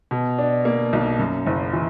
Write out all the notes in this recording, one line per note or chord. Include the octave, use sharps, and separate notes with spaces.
B2
D4
A#3
B1
F#2
F#1
E3